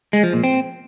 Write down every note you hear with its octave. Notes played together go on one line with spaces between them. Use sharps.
G#3
F3
A#2
C4